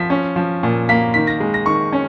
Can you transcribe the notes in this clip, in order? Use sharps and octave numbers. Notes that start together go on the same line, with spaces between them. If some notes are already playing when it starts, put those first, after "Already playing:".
Already playing: F3 B6
C#4
F3
A#2
A#3 B6
D#3 B6
A#6
G#3
A#6
D#3 C#6
C#4